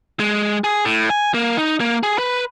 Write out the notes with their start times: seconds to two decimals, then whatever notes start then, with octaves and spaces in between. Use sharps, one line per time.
0.20 G#3
0.64 G#4
0.85 A2
1.10 G#5
1.34 A#3
1.57 D#4
1.80 A#3
2.03 G#4
2.18 B4